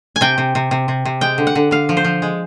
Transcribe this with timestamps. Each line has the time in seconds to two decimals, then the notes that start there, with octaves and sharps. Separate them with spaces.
0.16 G#5
0.21 C3 G5
0.38 C3
0.55 C3
0.71 C3
0.88 C3
1.05 C3
1.21 G#3 G5
1.38 D3
1.47 F#5
1.55 D3
1.71 D3 F5
1.89 F3
1.97 C5
2.04 F3
2.22 G#3